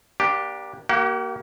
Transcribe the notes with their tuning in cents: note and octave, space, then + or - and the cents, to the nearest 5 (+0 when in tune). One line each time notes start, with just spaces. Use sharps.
A#3 +35 D4 +0 G4 +0
A#3 +5 G4 -40 F#5 +35